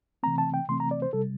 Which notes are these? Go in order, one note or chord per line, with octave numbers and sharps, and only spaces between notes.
C3 E3 A3 C4 A#5
A5
G5
C3 E3 A3 C4 C6
A#5
D5
C5
C3 G3 A4